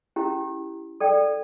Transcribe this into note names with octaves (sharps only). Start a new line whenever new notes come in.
C#4 E4 G4
A4 D5 G5